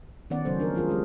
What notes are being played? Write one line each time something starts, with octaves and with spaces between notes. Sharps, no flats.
D#3 B3 C#4 D5 F#5
C#3 F#3 A3 C#4 A4 C5
F3 D4 A#4
F3 G#3 F4 G#4 A#4
G#3 C#4 F#4 G4